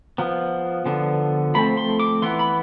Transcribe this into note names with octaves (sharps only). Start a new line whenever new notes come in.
F3 B3
D3 F3 B3
F3 A3 C4 B5
C6
D6
E3 B3 C6
B5